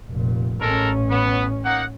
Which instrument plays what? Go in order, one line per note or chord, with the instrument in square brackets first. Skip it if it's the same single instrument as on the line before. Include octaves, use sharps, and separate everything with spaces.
[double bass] F1 A#2
[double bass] A1 C#4 [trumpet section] G#3 A4 A#4
[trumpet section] B3
A#3 D#4 F#5